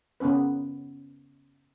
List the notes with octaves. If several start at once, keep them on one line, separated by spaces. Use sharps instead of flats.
C#3 A#3 B3 C#4 B4